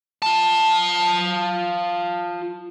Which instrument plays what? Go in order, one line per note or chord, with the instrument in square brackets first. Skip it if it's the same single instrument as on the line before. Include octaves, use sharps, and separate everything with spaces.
[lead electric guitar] F4 A5